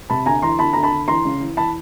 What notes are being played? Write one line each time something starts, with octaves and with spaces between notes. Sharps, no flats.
C3 A5 B5
D2 G#5 A#5
E3 A#5 C6
D2 A5 B5
D2 A#5
A5 B5
D2
E3 A#5 C6
C#3
E3
E3 A5 B5